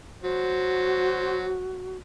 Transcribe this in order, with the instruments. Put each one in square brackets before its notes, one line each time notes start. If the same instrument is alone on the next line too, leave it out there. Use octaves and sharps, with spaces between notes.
[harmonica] F#3 C5 [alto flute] F#4